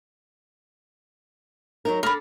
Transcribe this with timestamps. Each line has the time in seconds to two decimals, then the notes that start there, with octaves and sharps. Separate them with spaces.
1.85 F#3 D#4 A#4
2.03 D4 A4 A#4 B5